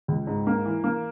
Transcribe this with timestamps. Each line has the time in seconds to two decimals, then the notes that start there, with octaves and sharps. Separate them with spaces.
0.08 C#2
0.27 G#2
0.47 A#3
0.65 E3
0.84 A#3